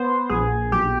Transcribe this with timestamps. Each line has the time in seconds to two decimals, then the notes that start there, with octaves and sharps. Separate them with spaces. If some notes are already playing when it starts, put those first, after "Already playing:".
Already playing: B3 C5
0.29 A#1 G#4
0.72 B1 G4